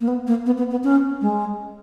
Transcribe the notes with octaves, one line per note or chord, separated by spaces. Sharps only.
A#3
B3
A#3
B3
B3
B3
C#4
G#3